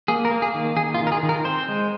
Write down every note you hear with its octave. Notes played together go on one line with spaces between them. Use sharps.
A#3 G#4
A#4
A#3
G#4
D#3
D#3 G#4
F4
D#3
A#4
G#4
D#3
A#4
C4 C5
G#3